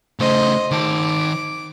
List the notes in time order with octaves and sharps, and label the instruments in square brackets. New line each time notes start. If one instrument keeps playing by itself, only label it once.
[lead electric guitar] C#3 A3 [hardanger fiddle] C5 D#5
[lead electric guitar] D#3 A5 [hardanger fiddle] D6